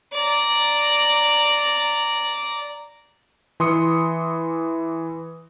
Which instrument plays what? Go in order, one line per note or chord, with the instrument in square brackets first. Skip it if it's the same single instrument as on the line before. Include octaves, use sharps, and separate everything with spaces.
[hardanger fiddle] D5 A#5
[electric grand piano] E3 C6 D#6 C#7